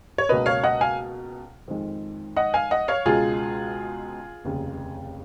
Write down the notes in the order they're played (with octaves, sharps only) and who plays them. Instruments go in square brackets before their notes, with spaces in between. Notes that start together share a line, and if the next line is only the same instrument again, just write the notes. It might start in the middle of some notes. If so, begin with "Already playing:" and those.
[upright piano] C#5
C#2 B2 A#3 B4 D#5
C#5 F5
D#5 F#5
F5 G#5
F2 D#3 G#3
D#5 F#5
F5 G#5
D#5 F#5
C#5 F5
C#2 B2 G#3 F4 G#4
F1 D#2 C#3